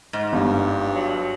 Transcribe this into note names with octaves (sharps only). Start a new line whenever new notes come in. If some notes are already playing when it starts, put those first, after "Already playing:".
G#2
G1 G2
F#3